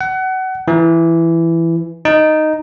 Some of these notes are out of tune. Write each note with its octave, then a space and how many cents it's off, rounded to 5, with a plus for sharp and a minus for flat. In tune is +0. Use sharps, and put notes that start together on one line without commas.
F#5 +25
E3 +10
D#4 -5